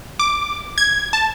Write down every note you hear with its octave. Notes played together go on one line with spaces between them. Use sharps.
D6
G#6
A5